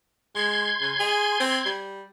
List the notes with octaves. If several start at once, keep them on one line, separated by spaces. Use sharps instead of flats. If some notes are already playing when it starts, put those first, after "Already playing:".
G#3 C6 G#6
C#3
G#4
C4
G3